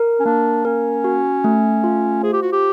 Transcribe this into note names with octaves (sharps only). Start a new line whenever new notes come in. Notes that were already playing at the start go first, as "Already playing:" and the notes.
Already playing: A#4
C#4
A#3 D4
C#4 A#4
F#4
A3
F4
G#4 C5
G4
F#4
G4